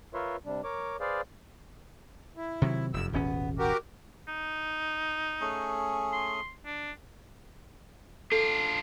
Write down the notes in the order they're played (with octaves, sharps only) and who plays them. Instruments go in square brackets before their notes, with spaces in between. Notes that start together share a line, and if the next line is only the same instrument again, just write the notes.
[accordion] F4 A#4 B4 C#5 E5 C6
C3 G3 D4
A#4 C#5 D6
G#4 B4 C5 D5 F5
E4
[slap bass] C3 D#3 F#3
[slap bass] F1 F#2 [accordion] E6
[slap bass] D#1 G#1 C#4 [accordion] B3
[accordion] F#4 G4 A#4
[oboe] D#4
[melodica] A3 C#4 G#4
[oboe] C6
D4
[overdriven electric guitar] D4 F4 [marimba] A4